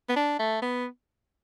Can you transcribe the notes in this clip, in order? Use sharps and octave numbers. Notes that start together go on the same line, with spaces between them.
B3
D4
A3
B3